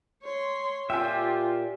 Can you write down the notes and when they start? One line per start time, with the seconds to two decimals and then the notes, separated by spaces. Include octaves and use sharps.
0.23 C#5 C6
0.90 A#2 F4 G4 E5 G5 G#5